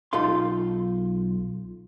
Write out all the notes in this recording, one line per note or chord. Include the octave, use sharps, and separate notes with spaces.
B1 D#4 F4 A4 F5 C6